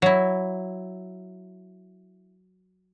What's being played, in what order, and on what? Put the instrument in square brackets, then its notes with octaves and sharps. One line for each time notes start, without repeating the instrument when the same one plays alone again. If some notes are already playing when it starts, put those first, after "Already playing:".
[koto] F#3 E4